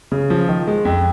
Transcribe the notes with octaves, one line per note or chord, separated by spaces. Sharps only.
C#3
F3
D#3
G#3
F2